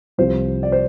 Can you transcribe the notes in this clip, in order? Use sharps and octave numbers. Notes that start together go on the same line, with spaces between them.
C2 C3 F3 C5
D5
C5